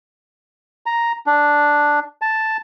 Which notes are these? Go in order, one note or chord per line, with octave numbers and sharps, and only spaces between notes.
A#5
D4
A5